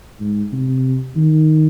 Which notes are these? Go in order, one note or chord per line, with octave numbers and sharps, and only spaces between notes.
G#2
C3
D#3